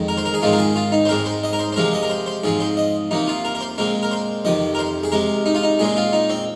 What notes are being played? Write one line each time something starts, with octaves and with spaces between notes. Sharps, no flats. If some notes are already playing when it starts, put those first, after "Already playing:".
Already playing: F2 D#3 G#3
A#4
C5
A#4
G#4
G#2 D#3 G#3 C4 F4
A#4
G#4
F4
D#4
C5
G#2 G#3 C4 A#4
C5
D#5
A#4
C5
C5
C3 F3 G#3 C4 A#4
D#5
A#4
C5
C5
G#2 F3 C4 G#4
C5
D#5
C3 F3 A#3 D#4
F4
A#4
A#4
C5
A#2 G#3 C4 A#4
A#4
C5
F2 C3 D#3 D#5
A#4
C5
G#4
C3 G#3 C4 A#4
D#4
F4
D#4
A#2 G#3 C4 G#4
F4
D#4
C4